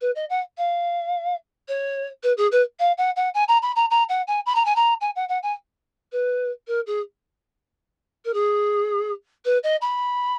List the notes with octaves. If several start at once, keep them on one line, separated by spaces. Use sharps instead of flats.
B4
D#5
F#5
F5
C#5
B4
G#4
B4
F5
F#5
F#5
G#5
A#5
B5
A#5
A#5
F#5
G#5
B5
A#5
G#5
A#5
G#5
F#5
F#5
G#5
B4
A#4
G#4
A#4
G#4
B4
D#5
B5